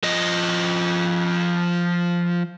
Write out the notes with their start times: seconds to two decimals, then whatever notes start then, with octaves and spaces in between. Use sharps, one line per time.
0.03 F3 D#5